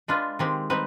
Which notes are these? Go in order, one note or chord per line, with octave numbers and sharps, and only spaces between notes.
G#3 D4 F4 B4
D#3 G#3 C4 G4
G3 C4 D#4 B4